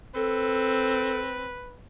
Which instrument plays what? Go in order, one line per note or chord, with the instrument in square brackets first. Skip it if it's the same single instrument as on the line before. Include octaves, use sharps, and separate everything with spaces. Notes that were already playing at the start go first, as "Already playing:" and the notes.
[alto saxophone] C4 [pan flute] A4 [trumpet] B4